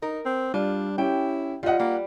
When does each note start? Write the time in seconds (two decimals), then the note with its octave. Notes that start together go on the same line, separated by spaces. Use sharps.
0.02 D#4 A#4
0.26 C4
0.54 G3 D4 F4
0.98 C#4 E4 G4 G5
1.63 G3 F4 D#5 F#5
1.79 G3 A#3